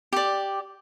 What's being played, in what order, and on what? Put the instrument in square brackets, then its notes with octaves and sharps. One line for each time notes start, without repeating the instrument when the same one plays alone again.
[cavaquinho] G4 D5